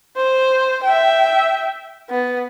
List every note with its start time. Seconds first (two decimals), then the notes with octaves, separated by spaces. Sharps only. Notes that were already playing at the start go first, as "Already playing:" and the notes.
0.17 C5
0.84 E5 G5
2.10 B3